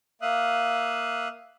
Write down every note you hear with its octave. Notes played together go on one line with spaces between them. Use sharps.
A#3 E5 F5 D#6 F#6